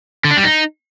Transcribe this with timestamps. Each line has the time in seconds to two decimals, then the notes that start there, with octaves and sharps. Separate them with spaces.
0.25 D3
0.31 D4
0.37 G3
0.43 D#4